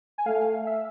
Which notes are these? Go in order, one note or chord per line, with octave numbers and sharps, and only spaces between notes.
G#5
A3 F5
E5